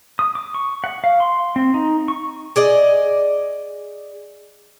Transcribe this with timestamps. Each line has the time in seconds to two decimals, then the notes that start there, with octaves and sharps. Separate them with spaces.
0.19 D#6
0.35 D6
0.54 C#6
0.84 F#5
1.04 F5
1.20 C6
1.56 C4
1.74 D#4
2.08 C#6
2.56 G#4 D5 D#5